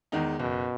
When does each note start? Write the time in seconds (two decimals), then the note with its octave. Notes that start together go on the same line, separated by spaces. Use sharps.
0.12 E2 D#3 G#3 D#4
0.40 F#1 B2